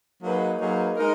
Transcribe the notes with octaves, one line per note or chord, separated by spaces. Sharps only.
F#3 A#3 D#4 G#4 B4
F#3 A#3 D#4 G#4 B4
G#3 D#4 A#4